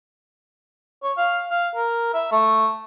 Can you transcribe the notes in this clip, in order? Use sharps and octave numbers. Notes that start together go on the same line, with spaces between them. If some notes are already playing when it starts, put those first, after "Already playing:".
C#5
F5
F5
A#4
E5
A3